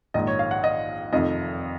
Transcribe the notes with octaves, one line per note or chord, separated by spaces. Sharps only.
A#1 G#2 D#3 D#5
C#5
F5
F#5
D#5
F1 F2 D#3 D#5